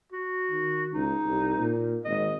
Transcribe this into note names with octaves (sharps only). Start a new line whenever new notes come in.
F#4
D#3
C#2 D#4
C2
A#2
G#1 D#5